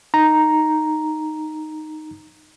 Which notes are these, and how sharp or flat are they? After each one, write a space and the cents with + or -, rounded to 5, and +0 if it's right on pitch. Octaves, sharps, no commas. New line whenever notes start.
D#4 -5 A#5 +0